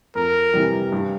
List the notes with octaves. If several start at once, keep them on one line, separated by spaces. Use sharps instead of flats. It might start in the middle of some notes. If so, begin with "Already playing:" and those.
F2 A#4
C3 E3 G3
G2